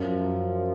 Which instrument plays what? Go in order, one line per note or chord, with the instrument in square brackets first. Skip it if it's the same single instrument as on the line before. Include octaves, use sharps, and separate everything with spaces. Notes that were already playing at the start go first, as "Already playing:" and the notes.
Already playing: [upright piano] F#2 [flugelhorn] F3